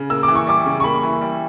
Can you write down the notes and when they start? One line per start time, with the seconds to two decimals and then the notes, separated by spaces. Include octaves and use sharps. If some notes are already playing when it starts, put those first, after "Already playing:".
Already playing: C#3
0.10 A#3 E6
0.23 D6
0.28 E3
0.35 C#6
0.47 G3 D6
0.66 C#3
0.80 C#6
0.84 A#3 B5
1.03 E3
1.21 G3